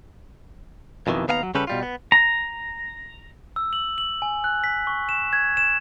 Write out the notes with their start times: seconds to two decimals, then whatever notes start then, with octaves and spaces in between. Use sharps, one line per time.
1.07 F2 B2 D#3 E3
1.28 D#2 B3 F5 G#5 A#5
1.43 F#3
1.55 C#3 G3 C#4 G4 A4 B4
1.67 B2 G3 F4
1.83 B3
2.12 A#5
3.56 E6
3.73 F#7
3.98 F#7
4.22 G#5
4.44 F#6
4.64 B6
4.87 C#6
5.09 E7
5.33 G#6
5.57 E7